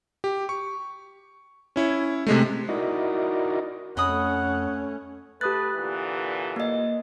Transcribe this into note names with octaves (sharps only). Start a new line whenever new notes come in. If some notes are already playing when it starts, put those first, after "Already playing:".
G4
C#6
C#4 E4 C#5
C3 G#3 A3
D#4 E4 F#4 A#4 D5 D#5
F2 A3 C#4 D#5 F#5 B5 D#6
A3 G4 B4 D#6 F#6 A6
A#2 D3 E3
A#3 D#5